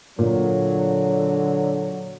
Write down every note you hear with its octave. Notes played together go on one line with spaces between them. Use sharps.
A#2 D3 F#3